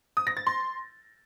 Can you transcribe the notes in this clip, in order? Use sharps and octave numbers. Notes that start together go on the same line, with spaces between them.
D#6
A#6
A6
C6